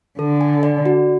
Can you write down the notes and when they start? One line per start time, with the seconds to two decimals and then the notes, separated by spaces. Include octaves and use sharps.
0.19 D3 A4
0.41 G#5
0.63 D5
0.86 F#4